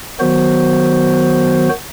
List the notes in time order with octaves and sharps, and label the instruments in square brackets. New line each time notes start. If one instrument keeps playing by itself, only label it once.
[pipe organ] D#3 F#3 B3 F#4 C5